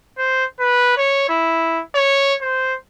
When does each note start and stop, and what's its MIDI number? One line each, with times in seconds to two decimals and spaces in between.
0.18 0.45 72
0.60 0.96 71
0.97 1.27 73
1.29 1.83 64
1.95 2.35 73
2.42 2.75 72